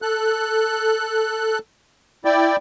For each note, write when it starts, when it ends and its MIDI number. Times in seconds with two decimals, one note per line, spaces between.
0.02 1.59 69
0.02 1.59 90
2.25 2.56 64
2.25 2.56 74
2.25 2.56 79